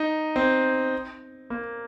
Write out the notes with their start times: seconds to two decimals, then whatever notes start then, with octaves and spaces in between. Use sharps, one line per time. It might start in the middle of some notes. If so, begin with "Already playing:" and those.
Already playing: D#4
0.36 C4
1.50 A#3